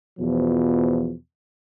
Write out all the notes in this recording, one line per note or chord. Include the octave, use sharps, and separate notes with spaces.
E2 B2 F3